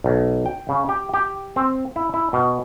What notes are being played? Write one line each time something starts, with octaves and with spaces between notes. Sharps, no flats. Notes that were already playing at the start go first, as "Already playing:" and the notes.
B1
G5
C#3
G4
G4
C4
E4
E4
B2